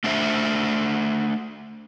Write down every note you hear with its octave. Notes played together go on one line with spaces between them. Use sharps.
A3 D4 C5 E5